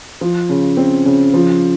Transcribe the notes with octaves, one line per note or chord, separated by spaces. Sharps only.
F3
C#3
C4
C#3
F3